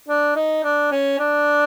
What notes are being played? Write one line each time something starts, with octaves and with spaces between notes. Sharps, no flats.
D4
D#4
D4
C#4
D4